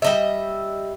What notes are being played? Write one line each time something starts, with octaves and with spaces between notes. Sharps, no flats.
G3 D#5 E5